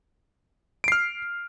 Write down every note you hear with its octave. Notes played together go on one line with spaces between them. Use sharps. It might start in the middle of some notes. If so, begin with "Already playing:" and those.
F6 C7 D7